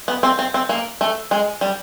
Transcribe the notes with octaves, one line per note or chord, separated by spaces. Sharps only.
B3
C4
C4
C4
A#3
A3
G#3
G3